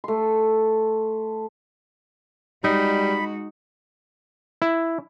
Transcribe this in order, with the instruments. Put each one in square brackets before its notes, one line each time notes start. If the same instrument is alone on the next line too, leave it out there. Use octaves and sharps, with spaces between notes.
[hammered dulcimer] A3 C6
[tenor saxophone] G3 [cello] G#3 F#4 [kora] D#4 [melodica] B5
[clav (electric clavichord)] E4